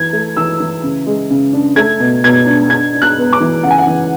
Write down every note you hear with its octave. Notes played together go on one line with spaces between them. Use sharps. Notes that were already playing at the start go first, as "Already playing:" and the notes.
Already playing: E3 G#6
A3
E3 E6
E3
C#3
G#3
C#3
D4
A3 G#6
B2
B2 G#6
D4
D4 G#6
D4
F#6
B3
D6
E3
C#3 F#5
G#5
F#5
E3